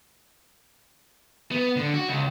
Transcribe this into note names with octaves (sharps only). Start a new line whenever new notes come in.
B3
D3
F#4
C#2